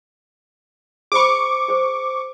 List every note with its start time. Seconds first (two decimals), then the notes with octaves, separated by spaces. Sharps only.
1.12 G#4 C5 B5 C#6 D6
1.68 G#4 C5